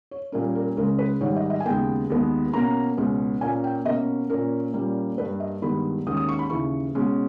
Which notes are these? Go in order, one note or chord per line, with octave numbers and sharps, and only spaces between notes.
C#5
A#2 G3 A#3 C#4 A#4
A#4
C#2 C#3 G#3 C#4 A#4
B4
G#2 D#3 G3 C#5
D#5
D#5
G#5
D#2 C#3 G#3 B3 G5
D#2 D#3 G#3 B3
B2 A#3 C#4 A#5
C#2 B2 G#3 C#4
A#2 A#3 C#4 G#5
G5
B2 A#3 C#4 D#5
A#2 A#3 C#4 A#4
A#2 G3 A#3 C#4
G2 G3 A#3 B4
D#5
G2 D#3 G#3 B3 B5
D#2 D#3 G#3 C#4 D#6
D#6
C#6
B5
D#2 C#3 E3 C#6
B2 G#3 C#4